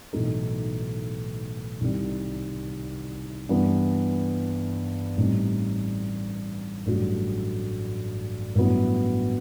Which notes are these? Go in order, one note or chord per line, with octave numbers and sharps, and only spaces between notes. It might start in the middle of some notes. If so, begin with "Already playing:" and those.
B1 A2 E3 A3 D#4
C2 C3 D#3 G3
G2 E3 B3
A1 A2 G3 C4 D#4
A1 G2 F#3 A3
A1 G2 F#3 B3 E4